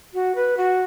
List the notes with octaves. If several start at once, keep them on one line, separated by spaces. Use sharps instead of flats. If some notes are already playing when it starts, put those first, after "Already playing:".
F#4
B4
F#4